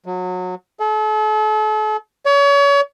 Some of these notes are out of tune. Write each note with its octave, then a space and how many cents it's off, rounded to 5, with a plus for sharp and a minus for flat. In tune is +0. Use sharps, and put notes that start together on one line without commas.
F#3 -25
A4 -40
C#5 +35